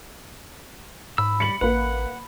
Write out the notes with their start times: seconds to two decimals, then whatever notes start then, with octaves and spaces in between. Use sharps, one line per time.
1.18 G#2 B5 E6
1.40 G3 C#7 F#7
1.61 A1 A#3 B4 F#5